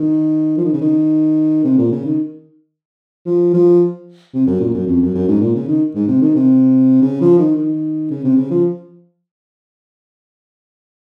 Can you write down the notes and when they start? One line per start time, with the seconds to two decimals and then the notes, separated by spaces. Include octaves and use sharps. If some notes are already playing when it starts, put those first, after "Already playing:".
Already playing: D#3
0.57 F3
0.65 D#3
0.73 C#3
0.81 D#3
1.65 C3
1.78 A#2
1.92 C#3
2.05 D#3
3.26 F3
3.53 F3
4.34 C3
4.47 F#2
4.60 A#2
4.74 F#2
4.87 F2
5.02 F#2
5.14 F#2
5.28 G#2
5.41 A#2
5.55 C#3
5.68 D#3
5.95 G#2
6.08 C3
6.22 D#3
6.35 C3
7.02 C#3
7.21 F3
7.38 D#3
7.56 D#3
8.11 C#3
8.24 C3
8.37 C#3
8.51 F3